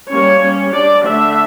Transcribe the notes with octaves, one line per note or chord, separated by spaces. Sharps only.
G3 A#3 C#4 C#5
G3 C#4
G3 D4 D5
D3 A3 D4 E5